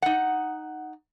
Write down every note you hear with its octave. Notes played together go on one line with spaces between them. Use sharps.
D#4 F#5